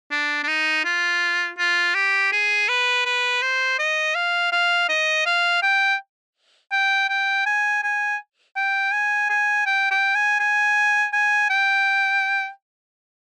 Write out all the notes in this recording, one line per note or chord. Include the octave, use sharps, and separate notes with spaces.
D4
D4
D#4
F4
F4
G4
G#4
B4
B4
C5
D#5
F5
F5
D#5
F5
G5
G5
G5
G#5
G#5
G5
G#5
G#5
G5
G5
G#5
G#5
G#5
G5